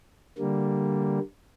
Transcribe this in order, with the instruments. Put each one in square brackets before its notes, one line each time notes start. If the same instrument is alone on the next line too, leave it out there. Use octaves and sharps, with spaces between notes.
[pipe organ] D3 G3 A#3